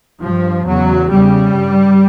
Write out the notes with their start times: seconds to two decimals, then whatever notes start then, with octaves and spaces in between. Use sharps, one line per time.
0.21 G2 F3
0.65 E2 C#3 F#3
1.10 E2 C#3 G3
1.54 G2